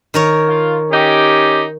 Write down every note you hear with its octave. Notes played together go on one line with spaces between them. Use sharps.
D#3 A#4 C#5
F4
C#4 D#4 G4